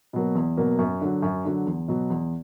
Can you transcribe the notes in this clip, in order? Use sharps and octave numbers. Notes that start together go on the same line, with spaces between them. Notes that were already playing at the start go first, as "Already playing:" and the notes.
B2 F#3 A#3
E2
B2 F#3 A#3
F#2
D3 F#3
F#2
D3 F#3
E2
B2 F#3
E2